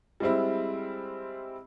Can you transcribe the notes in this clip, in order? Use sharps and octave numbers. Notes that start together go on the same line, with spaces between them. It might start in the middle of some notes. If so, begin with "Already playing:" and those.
G3 G#3 C4 E4